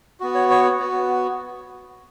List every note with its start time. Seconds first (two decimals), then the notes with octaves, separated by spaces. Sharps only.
0.20 B3 F#4
0.35 C#5
0.50 C#5
0.80 B3 F#4